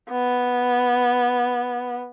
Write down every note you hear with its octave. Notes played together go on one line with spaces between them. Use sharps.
B3